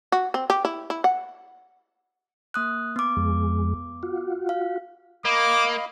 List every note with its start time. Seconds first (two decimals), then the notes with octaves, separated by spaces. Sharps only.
0.12 F#4
0.34 C4
0.50 G4
0.65 E4
0.90 E4
1.04 F#5
2.54 A#3 D#6 F#6
2.96 B3 D6
3.17 F2 G#3
4.03 F4 F#4
4.49 F5
5.25 A#3 D#5 F5 B5 D6